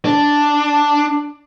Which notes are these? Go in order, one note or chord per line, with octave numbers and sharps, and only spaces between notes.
D4